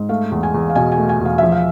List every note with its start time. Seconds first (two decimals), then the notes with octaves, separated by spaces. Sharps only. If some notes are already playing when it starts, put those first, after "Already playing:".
Already playing: G#2
0.09 A3 F5
0.31 E2
0.43 G#5
0.54 E2
0.70 F5
0.75 B2 G#5
0.92 G#5
0.98 A3
1.09 G#5
1.20 E2
1.26 F5
1.38 F3 E5
1.52 F5